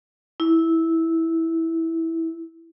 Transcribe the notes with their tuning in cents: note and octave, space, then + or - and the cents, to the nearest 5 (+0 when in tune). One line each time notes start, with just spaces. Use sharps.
E4 -10